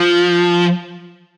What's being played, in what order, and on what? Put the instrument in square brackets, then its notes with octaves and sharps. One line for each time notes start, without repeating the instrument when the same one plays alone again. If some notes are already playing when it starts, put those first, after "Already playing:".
Already playing: [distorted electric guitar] F3